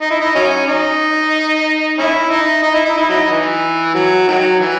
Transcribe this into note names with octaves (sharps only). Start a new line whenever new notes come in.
D#4
E4
D#4
F#3 C#4
D#4
C#4 E4
D#4
D#4
E4
D#4
E4
F#3 D#4
E3
F#3
D#3 F#3
E3